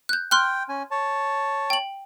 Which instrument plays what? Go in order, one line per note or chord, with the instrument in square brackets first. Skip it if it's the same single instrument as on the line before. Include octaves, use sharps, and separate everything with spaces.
[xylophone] F#6 G6
[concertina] G5 [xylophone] C6 F6 F#6
[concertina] C#4 G#5
C#5 A5
[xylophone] G5 F#7